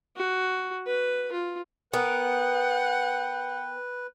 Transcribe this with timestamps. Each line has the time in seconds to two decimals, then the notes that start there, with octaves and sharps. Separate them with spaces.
0.17 F#4
0.86 B4
1.32 F4
1.93 B3 A#4 B4 F#5 G5